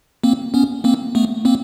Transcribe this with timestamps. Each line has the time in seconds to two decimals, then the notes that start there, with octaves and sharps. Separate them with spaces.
0.24 A#3 C4
0.54 B3 C#4
0.84 A#3 C4
1.15 A3 B3
1.45 A#3 C4